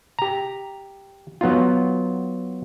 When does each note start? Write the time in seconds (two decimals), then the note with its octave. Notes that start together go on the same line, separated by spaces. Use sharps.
0.19 G4 A#5
1.41 F#3 B3 D#4 F4